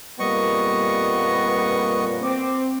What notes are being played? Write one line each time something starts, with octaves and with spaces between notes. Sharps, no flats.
F2 A#2 G3 A#3 B3 D#5 C#6
C4 D6